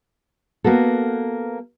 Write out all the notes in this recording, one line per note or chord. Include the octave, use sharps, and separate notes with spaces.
A#3 B3 F#4 A4